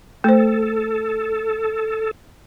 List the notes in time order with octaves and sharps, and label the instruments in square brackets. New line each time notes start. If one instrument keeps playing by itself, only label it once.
[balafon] A3 C5 [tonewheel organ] A4